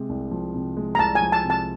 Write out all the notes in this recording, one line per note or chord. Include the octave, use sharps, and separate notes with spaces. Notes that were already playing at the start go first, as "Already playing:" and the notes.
Already playing: C3 G#3
C2
F3
C3
G#3
A#5
C2 A5
G#5
F3
A5
C3
A5